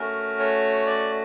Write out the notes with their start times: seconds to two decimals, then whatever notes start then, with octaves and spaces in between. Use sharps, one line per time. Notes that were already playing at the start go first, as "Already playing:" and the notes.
Already playing: A3 C#4 F#4 A#4
0.40 C#5
0.86 D5